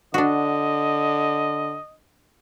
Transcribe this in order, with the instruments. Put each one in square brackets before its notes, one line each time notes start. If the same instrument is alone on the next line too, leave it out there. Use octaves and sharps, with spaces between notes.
[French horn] D3 [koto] D4 F#4 [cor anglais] D#5